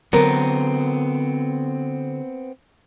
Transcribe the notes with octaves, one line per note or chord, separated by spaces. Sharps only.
D3 F#3 B3 C4 A#4